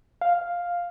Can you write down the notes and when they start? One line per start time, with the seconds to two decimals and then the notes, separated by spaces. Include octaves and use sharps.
0.21 F5